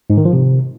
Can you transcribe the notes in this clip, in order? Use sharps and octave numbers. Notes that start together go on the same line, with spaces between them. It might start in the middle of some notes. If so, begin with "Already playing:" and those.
G#2
D#3
F3
C3